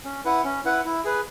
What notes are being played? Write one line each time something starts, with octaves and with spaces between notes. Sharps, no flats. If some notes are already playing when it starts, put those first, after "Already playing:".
C#4
E4 B4 F#5
C#4
E4 B4 F#5
E4
G#4 B4